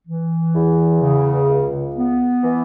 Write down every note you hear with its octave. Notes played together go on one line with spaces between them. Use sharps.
E3
E2
C#3
C#2
B3
E3